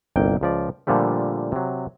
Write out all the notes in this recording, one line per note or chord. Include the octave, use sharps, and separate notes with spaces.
G1 C2 A#3 G5
C#2 F3 D5
A#2 D3 F3 G3 A3
C3 F#3